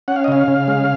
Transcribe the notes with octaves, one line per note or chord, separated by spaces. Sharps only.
C#4 F#5
F5
D#5
C#3 F5
C#3
G#3